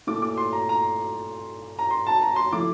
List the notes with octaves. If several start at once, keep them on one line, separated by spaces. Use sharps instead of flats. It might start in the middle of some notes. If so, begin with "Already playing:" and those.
A#2 A3 E4 D6
D6
C6
A#5
A#5
A#5
C6
A5
A#5
C6
F3 A3 E4 D6